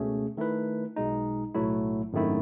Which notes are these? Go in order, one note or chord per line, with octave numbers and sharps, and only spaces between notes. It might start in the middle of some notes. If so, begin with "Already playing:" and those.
Already playing: C#2 B2 A3 C#4 G#4
D#3 A3 E4 B4
B1 B2 G#3 D#4
B1 A2 F#3 A3 E4
G#1 F#2 D#3 A3 E4